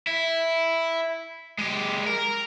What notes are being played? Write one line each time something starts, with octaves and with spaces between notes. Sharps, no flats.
E4
G#3 G4
A#4